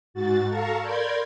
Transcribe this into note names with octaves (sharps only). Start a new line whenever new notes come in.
G#2 F#4 A6
A4 F5 A5 A#5 C#6
A#4 D5 B5 C6 G6 G#6